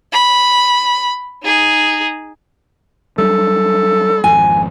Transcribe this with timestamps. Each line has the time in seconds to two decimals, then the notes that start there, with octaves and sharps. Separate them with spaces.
0.13 B5
1.44 D#4 G#4
3.18 F#3 G3 D4 A4
4.24 G#1 F2 G#5